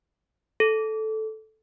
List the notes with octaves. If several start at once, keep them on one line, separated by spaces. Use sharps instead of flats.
A4